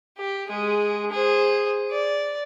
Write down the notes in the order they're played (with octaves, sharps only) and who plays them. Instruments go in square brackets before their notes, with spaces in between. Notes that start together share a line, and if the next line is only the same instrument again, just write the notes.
[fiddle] G4
G#3 G#4
G#4 C5
D5